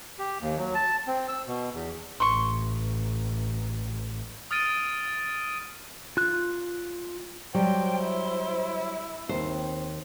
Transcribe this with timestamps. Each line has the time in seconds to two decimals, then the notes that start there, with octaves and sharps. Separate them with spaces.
0.19 G4
0.41 D#2
0.58 F#3
0.75 A5
1.07 C4
1.29 E6
1.47 B2
1.74 E2
2.20 A1 C6 C#6
4.51 D#6 F6 A6 D7 D#7
6.17 F4 F#6
7.54 F#3 G3 C5 G5
8.01 E4
9.29 D#2 C4 C5